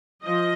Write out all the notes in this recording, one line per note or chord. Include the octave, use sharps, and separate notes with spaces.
F3 D#5